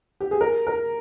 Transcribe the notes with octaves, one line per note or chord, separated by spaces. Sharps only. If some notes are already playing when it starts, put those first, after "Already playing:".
G4
G#4
A#4
A#4